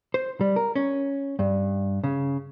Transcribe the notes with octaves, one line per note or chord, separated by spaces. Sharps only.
C5
G3
A#4
C#4
G2
C#3